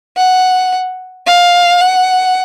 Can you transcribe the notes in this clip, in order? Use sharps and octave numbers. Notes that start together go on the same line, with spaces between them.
F#5
F5
F#5